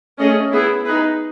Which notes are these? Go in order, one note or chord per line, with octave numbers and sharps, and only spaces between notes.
A3 C#4 G#4 D#5
B3 E4 G#4
D#4 G#4 B4